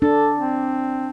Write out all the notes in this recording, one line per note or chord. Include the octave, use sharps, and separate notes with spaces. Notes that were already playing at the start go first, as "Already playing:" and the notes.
D4 A4
C4